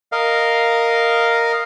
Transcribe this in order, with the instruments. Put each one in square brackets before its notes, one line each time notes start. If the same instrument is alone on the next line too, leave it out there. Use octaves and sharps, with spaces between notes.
[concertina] A#4 D#5 F5